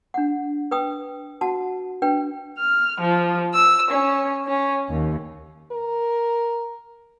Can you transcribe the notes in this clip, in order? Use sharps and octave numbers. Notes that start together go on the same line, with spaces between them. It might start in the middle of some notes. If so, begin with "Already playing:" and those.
D4 F#5
B4 G5 D#6
F#4 F#5 A5
D4 B4 G5
F6
F3
E6
C#4
C#4
D#2
A#4